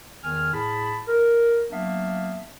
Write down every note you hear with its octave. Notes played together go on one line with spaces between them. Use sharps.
E2 D#3 G#5 F6
A2 G#4 A5 B5
A#4
F#3 A#3 B3 D4 E5 F5